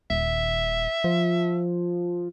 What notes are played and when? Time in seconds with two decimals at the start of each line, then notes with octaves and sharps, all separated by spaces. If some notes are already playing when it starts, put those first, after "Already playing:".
0.10 D#1 E5
1.04 F3